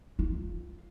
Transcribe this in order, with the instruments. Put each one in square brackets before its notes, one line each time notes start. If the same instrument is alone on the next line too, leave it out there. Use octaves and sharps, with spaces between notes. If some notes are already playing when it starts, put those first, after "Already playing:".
[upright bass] F4